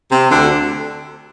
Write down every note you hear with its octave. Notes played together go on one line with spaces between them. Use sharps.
C3
D2 D3